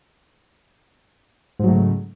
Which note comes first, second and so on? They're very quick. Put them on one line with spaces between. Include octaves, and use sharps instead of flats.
G#2 F#3 A3 C#3